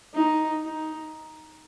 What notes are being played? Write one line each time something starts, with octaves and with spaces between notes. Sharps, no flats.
D#4
D#4